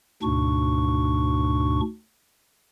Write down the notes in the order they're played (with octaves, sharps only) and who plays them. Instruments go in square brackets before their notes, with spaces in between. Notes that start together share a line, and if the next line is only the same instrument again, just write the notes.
[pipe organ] D2 G#2 B2 D4 C#6